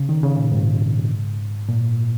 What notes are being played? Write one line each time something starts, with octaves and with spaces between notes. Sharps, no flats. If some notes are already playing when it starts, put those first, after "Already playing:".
Already playing: C#3
D#3
C#3
A#2
G#2
A#2